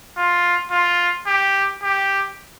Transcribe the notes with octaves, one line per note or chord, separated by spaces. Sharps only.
F4
F4
G4
G4